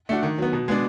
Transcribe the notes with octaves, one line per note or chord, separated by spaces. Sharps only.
A3 D4 F#4
D#3
F#3 B3
B2
G#3 B3 D4